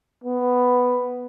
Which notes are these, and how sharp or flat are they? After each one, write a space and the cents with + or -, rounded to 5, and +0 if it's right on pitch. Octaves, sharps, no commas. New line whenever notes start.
B3 +5